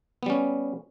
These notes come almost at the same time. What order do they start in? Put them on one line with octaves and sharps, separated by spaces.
B3 G3 C#4